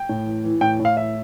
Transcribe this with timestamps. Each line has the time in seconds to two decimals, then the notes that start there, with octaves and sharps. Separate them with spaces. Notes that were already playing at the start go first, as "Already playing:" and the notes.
Already playing: G5
0.09 A2
0.26 E3
0.44 E3
0.61 A2 G5
0.79 A2
0.85 F5
0.97 E3 E5